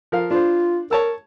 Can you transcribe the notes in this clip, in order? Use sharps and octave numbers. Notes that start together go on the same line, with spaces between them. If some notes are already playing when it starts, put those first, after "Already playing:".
F3 A#4 F5
D4 F4 C5
A#4 C#5 A5 E6